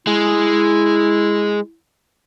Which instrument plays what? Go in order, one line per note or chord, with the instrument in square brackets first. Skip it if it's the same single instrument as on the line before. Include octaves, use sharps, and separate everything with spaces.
[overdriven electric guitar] G#3 [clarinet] E4